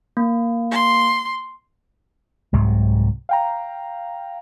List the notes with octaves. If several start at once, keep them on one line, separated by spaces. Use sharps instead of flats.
A#3
C6
C2 G#2 C3 F#3
F5 G5 A#5